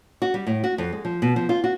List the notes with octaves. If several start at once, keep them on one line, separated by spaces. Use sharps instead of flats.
F#4
G3
A2
F#4
F2
G#3
F3
B2
F3
F4
F#4